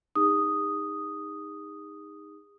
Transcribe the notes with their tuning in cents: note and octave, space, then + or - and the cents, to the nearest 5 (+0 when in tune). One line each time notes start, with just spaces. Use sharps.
D#4 +0 G#4 -40 D#6 +0